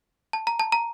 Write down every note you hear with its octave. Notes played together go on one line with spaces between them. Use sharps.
A5
A#5
A5
A#5